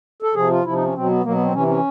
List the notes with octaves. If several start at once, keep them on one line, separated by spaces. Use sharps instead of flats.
A4
C3 F3 G#4
F4
C3 F3 E4
D#4
C#4
B2 F#3 C4
B3
B2 F#3 A#3
B3
C4
C3 E3 C#4
C#4